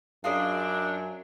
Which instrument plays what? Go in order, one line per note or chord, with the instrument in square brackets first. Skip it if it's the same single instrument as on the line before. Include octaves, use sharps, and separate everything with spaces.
[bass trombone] F#2 [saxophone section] D4 [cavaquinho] F4 G#4 D#5